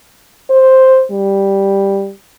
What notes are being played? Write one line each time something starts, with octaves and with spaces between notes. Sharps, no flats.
C5
G3